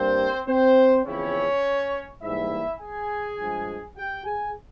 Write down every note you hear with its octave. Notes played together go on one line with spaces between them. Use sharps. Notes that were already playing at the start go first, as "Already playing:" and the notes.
Already playing: G2 G3 A#3 C4 C5
C4 C5
E2 C#3 F3 C4 C#4 E4 C#5
G#2 E3 G3 A#3 E4 E5
G#4 G#5
G2 F3 G#3
G4 G5
G#4 G#5